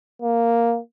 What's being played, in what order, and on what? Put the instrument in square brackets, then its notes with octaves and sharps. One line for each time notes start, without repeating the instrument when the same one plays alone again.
[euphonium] A#3